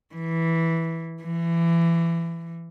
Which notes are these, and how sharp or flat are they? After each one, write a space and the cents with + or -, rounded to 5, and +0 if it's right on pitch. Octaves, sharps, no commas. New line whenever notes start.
E3 -5
E3 +25